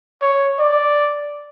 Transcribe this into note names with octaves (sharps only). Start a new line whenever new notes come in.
C#5
D5